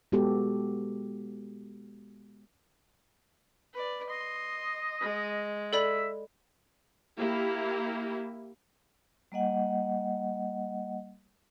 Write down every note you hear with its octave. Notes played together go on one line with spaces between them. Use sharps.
G#3 B3 F#4 G4 A4
B4 D5
D#5 C6
G#3
A4 D5 E5 B5
A#3 E4 G4
G3 A#3 D#5 F#5